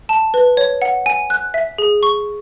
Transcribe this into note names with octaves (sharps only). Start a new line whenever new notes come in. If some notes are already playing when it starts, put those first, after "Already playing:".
A5
B4
C#5
F#5
G#5
F#6
E5
G#4
C#6